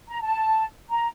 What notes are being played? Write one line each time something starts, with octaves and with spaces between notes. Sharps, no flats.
A#5
A5
A#5